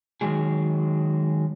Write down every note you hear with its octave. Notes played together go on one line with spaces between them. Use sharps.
D#3 F#3 G#3 G#4